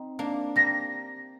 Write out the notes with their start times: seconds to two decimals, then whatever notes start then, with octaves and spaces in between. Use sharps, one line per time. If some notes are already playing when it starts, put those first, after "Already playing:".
Already playing: C4 D#4
0.19 A#3 D4
0.56 G3 A#3 A#6